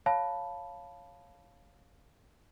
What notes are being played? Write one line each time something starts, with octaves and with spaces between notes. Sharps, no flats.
C#5 F5 A5 B5